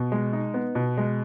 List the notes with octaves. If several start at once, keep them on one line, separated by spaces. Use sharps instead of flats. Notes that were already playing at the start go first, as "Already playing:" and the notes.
Already playing: B2
G#3
D#4
B3
B2
G#3